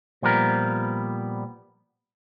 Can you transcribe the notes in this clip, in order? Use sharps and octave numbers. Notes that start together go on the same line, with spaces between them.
A#2 F3 G3 B3 A#4